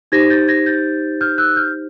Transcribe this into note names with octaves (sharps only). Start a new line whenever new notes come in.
D#4 G4 C5 G#6 A#6
G6 A6
G#6 A#6
G6 A6
F6 G6
E6 F#6
F6 G6